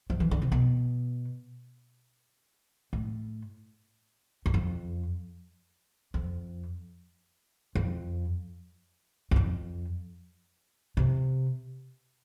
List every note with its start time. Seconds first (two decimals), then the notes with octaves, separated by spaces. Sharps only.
0.10 F3
0.20 E3
0.31 D3
0.42 C3
0.52 B2
2.93 A2
4.46 E2
4.54 F2
6.14 F2
7.75 F2
9.31 E2
9.36 F2
10.97 C3